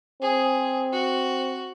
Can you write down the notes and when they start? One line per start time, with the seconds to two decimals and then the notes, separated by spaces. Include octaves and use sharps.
0.22 C4 G#4
0.93 F#4